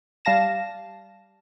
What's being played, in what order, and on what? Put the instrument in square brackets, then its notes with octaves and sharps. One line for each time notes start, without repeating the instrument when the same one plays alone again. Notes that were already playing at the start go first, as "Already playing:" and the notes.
[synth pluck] G3 F5 A5 A#6 E7